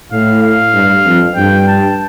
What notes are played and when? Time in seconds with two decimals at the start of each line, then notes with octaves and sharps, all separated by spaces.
0.11 A2 F5
0.43 F5
0.74 G2
1.05 F2
1.36 G2 G5
1.68 A5